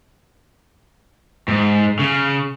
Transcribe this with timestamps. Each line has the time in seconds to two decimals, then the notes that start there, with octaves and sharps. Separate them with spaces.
1.48 G#2
1.99 C#3